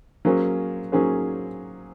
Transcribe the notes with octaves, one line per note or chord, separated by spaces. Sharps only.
F#3 A#3 C#4 G#4 C5
F#3 A#3 C#4 G#4 C5